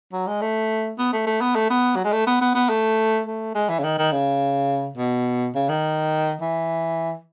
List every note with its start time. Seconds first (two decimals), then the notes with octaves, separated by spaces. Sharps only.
0.12 F#3
0.27 G#3
0.41 A3
0.98 B3
1.13 A3
1.26 A3
1.41 B3
1.55 A3
1.70 B3
1.96 F#3
2.04 G#3
2.12 A3
2.27 B3
2.41 B3
2.54 B3
2.69 A3
3.26 A3
3.55 G#3
3.69 E3
3.79 C#3
3.83 D#3
3.98 D#3
4.12 C#3
4.98 B2
5.55 C#3
5.69 D#3
6.40 E3